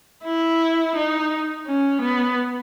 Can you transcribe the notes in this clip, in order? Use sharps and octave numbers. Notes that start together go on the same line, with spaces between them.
E4
D#4
C#4
B3